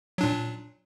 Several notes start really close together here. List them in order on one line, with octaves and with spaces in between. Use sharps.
F#3 D4 A#2